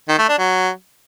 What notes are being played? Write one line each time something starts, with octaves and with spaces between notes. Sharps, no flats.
D#3
A3
D4
F#3